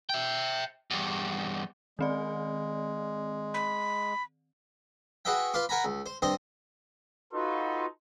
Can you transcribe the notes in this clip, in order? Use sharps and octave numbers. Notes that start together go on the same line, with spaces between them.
E5 G5
E2 G2
D#3 G#3 C4 D5
B5
F#4 G#4 B4 D#5 E5 G5
F4 B4 F5 C6 D6
A#4 F#5 G#5 A#5 B5
C#2
C5
G2 C4 C5 D#5 C6 D#6
D#4 F4 F#4 A4 B4 C6